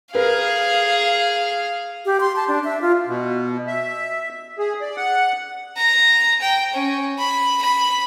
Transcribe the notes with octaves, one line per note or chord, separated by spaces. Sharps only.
G#4 A#4 B4 F5
G4
C6
A5
D4
E5
F4
B2
E5
G#4
D5
F#5
A#5
G5
C#4
B5
B5